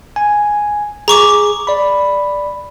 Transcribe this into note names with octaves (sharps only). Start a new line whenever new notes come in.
G#5
G#4 A#5 C#6 D6
D5 B5